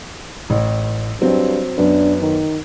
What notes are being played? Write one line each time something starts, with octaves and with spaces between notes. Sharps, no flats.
A1
G2 F#3 C4
F#2 B3 D4
D#3